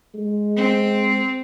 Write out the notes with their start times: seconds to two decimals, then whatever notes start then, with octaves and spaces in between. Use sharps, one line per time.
0.14 G#3
0.57 C4